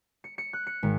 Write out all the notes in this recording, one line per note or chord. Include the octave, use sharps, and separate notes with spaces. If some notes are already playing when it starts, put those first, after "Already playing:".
C#7
C#7
F#6
C#7
G#1